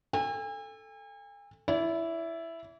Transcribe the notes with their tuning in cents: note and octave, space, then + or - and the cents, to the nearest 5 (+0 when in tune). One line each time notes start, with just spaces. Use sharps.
A4 +0 G#5 -45
E4 +5 D5 -40